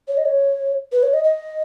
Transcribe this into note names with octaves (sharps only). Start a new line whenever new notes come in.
C#5
D#5
C#5
B4
C#5
D#5
D#5